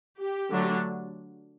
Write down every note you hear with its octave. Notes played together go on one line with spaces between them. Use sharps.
G4
D3 F#3 A3 D4